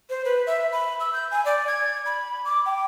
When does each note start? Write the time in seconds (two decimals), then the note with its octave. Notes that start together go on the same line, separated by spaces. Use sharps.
0.10 C5
0.25 B4
0.47 E5
0.72 B5
1.00 E6
1.13 G6
1.31 G#5
1.45 D5
1.67 G#6
2.06 B5
2.45 D6
2.66 G5